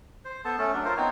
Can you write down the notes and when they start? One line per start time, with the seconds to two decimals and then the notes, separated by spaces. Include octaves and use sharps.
0.25 C5
0.45 B3 A4 A5
0.58 A3 C#4 A4
0.73 F#3 D4
0.85 F4 A#4 C5
0.97 B3 C4 D#4 C#5